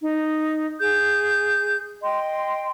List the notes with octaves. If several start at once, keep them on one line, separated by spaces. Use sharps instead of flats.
D#4
G#4 G6
D#5 G5 C6